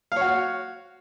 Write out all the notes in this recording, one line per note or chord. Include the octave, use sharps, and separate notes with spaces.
F#4 C#5 F5